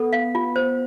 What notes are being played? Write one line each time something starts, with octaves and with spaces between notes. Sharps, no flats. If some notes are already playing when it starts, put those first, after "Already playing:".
Already playing: B3 A4
F5
F4
C5